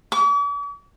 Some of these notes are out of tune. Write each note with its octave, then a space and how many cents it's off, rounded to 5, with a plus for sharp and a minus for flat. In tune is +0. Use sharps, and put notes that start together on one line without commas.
D6 -45